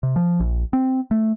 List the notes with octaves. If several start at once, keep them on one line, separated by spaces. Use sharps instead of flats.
C3
F3
A#1
C4
A3